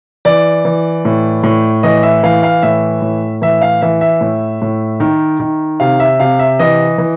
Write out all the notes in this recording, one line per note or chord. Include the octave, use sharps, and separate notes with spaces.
E3 D5
E3
A2
A2
E3 D#5
E5
E3 F5
F5
A2 E5
A2
E3 E5
F5
E3 E5
E5
A2
A2
D#3
D#3
C3 F5
E5
C3 F5
E5
E3 D#5
E3